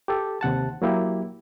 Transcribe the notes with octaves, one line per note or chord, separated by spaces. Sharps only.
G4 A4
D#2 C3 F#5 A5
F#3 A#3 E4 G4